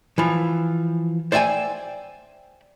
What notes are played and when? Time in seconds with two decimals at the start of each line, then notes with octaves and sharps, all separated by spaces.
0.18 E3 F3
1.32 C5 D5 E5 G5 G#5